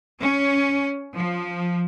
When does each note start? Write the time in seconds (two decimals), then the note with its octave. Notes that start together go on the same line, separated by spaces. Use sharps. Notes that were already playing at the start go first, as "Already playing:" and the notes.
0.22 C#4
1.16 F3